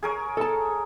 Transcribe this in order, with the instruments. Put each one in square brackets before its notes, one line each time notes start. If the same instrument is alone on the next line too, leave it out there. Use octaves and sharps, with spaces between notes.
[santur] G#4 A#4 C#5
[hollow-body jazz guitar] A4 A5